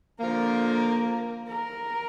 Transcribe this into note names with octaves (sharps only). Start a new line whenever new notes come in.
D3 F3 A#3 A#4
A#4